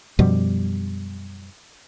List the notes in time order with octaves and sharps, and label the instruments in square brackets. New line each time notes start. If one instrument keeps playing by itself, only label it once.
[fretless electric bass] F#2 B2 F3 G3